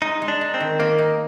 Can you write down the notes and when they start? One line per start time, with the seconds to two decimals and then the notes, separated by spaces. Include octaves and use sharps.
0.02 G#3 D#4
0.22 G#3
0.28 D4
0.41 D#4
0.54 C4
0.60 D#3
0.80 D#3 A#3
0.99 D#4